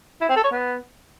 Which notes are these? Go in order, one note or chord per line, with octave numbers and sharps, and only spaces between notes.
E4
C4
A4
C#5
B3